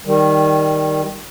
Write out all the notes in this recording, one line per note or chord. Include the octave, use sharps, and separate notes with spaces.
D#3 G3